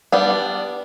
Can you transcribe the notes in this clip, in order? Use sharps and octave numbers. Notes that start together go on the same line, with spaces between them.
G3 B3 D4